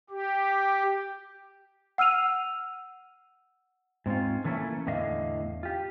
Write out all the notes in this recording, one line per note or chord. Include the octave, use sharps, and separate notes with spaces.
G4
F#5 E6 F6 D#7 F7
G#2 C4 C#4 F4
D3 E3 A3 A#3 C#4 E4
E2 A2 D3 D#5 F5
F4 G4